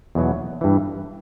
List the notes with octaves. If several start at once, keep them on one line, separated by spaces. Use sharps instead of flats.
E2 B2 F#3
G2 E3